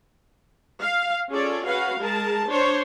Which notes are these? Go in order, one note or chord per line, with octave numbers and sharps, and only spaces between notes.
F5
C#4 F4 G#4 A4 C#5 D5
C#4 F#4 B4 F5 F#5
G#3 G#4 A#4 A5
D4 C5 C#5